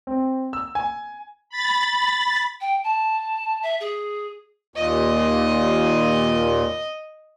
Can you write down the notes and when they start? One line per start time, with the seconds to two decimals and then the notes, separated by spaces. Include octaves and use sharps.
0.07 C4
0.53 E6
0.75 G#5
1.49 B5 A6
2.60 G5
2.83 A5
3.62 E5
3.80 G#4
4.76 D#2 A#2 D#5